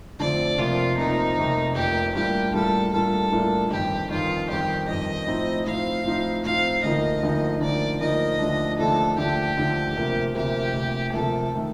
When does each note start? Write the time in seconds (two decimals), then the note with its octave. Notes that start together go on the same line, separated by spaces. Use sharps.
0.19 F2 D3 F3 A3 C4 D5
0.58 F1 F2 C3 F3 A#3 F4
0.97 F1 F2 C3 F3 A#3 D#4
1.37 F1 F2 C3 F3 A#3
1.75 F1 F2 C3 F3 A#3 G4
2.15 A2 G3 A#3 D4 F4 G4
2.53 A2 G3 A#3 D4 F4 A4
2.93 A2 G3 A#3 D4 F4 A4
3.32 A2 G3 A#3 D4 F4
3.70 G1 F2 D#3 G4
4.10 G1 F2 D#3 F4
4.49 G1 F2 D#3 G4
4.88 G1 F2 D#3 D#5
5.27 A2 F3 C4 D#4
5.65 A2 F3 C4 D#4 F5
6.05 A2 F3 C4 D#4
6.44 A2 F3 C4 D#4 F5
6.83 D2 D3 F3 A#3 D#4 D#5
7.23 D2 D3 F3 A#3 D#4
7.61 D2 D3 F3 A#3 D#4 D5
8.00 D2 D3 F3 A#3 D#4 D#5
8.39 D#2 D3 F3 A3 D4
8.78 D#2 D3 F3 A3 D4 A4
9.18 D#2 D3 F3 A3 D4 G4
9.57 D#2 D3 F3 A3 D4
9.96 D2 C3 F3 A#3
10.35 D2 C3 F3 A#3 G4
10.74 D2 C3 F3 A#3
11.12 D2 C3 F3 A#3 A4
11.55 D#3 A3